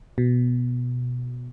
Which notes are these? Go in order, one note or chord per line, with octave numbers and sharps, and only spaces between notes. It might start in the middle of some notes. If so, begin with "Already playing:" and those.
B2